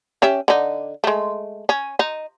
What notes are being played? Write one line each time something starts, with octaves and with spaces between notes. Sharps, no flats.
C#4 G4 E5
D3 D#4
G#3 A3
C#4
D#4